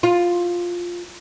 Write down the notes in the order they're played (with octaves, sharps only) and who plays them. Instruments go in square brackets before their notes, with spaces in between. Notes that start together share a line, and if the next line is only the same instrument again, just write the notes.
[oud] F4